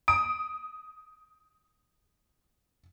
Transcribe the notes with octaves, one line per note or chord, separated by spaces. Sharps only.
D#6 D7